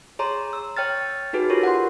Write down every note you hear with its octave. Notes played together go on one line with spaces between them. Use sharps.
G#4 C#5 A#5 C6
E6
C#5 G5 F6 A6
D#4 F#4 G#4 B4
F4 G4 A#4 C#5
F#5 C6